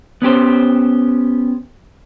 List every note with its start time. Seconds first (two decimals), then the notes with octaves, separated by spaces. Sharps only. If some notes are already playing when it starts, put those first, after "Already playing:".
0.22 B3 C#4 G4 C5